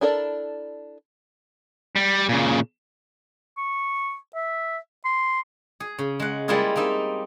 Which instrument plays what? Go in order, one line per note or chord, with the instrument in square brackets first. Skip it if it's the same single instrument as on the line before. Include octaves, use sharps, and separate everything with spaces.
[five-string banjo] D4 E4 A4 A#4 D5
[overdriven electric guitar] G3
A#2 C#3
[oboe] C#6
E5
C6
[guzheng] G#4
C#3
G#3 F#5
G3 G#3 A#3 E4 F4 G#4
A#3 C4 D#4 E5